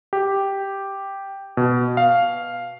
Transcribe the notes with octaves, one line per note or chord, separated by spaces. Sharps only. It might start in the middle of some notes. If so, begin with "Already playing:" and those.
G4
B2
F5